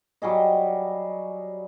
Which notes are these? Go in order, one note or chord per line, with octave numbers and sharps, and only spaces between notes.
F#3 G3 G#4 D#5